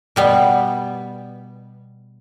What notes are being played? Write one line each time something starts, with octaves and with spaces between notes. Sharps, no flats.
B2 G3 B3